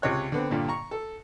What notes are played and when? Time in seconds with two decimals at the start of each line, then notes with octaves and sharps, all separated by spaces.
0.02 C#2 C3 C#5 F#6
0.32 D3 B3 C4
0.51 G2 A#2 D3
0.69 A#5 C#6
0.91 A4